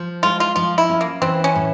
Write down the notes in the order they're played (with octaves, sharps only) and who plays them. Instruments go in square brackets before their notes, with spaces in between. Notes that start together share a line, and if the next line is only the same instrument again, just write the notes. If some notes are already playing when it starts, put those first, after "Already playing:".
Already playing: [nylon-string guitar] F3
[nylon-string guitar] G#3 [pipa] F4
[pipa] F4
[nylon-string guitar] F3 [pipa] F4
[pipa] E4
[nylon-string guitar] C#4
[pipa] A#3
[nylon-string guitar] E3 [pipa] C4
[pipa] C#4
[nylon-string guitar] A2